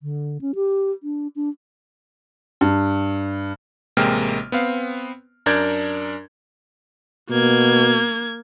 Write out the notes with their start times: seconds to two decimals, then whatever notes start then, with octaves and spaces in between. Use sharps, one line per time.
0.03 D3
0.41 C#4
0.55 G4
1.03 D4
1.36 D4
2.61 G2
3.97 A1 C3 G#3 A#3 G5 F6
4.52 B3 C4 F5
5.46 F#2 D4 A#4 D5 G6 G#6
7.30 B2 A#3 G#6